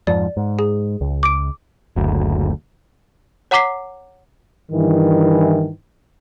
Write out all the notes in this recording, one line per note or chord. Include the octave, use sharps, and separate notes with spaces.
F2 G#2 F3 D5
G#2
G#4
C#2
D6 D7
F#1 D2
C#5 F#5 A#5 D6 B6 C7
G2 D#3 E3